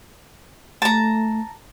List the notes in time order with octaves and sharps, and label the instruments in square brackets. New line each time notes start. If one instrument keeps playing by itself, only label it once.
[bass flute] A3 [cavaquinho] A5 A#5